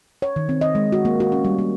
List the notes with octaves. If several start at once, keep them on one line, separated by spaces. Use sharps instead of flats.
C#5
D#3
C4
D#5
G#3
F#4
A#3
F#4
C#4
G3
A#3